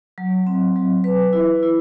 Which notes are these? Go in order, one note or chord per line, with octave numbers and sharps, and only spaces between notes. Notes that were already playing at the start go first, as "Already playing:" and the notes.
F#3
C4
F#3
B4
E4
E4